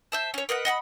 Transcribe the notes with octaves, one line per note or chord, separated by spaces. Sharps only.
C5 E5 A5
C#4 C#5
A#4 B4 D#5 F#5
D#5 F#5 A5 B5